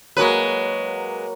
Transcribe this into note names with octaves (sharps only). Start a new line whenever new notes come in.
F#3 G#3 A#3 F#4 B4